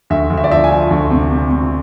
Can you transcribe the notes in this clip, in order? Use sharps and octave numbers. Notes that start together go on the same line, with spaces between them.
D2 E5
D2
E5
D5
F3 E5
G#5
F3
D2
C3
C3
C3